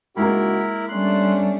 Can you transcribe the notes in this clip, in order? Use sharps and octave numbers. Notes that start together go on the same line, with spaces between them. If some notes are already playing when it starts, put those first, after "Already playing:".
C#2 G#3 A#3 D#4 E4 F#4 A#4 B5
G3 A3 B3 C#4 D4 C6 F#6